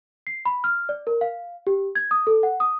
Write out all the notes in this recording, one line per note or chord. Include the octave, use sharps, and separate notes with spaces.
C7
B5
F6
D5
A#4
F5
G4
G#6
D#6
A4
F#5
D#6